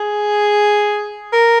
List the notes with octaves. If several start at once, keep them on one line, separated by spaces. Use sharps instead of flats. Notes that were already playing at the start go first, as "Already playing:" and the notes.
Already playing: G#4
A#4